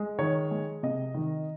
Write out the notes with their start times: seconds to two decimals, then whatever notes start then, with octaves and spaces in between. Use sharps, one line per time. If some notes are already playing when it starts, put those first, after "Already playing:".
Already playing: G#3
0.19 D#3 C#5
0.51 G#3
0.83 C3 D#5
1.14 D#3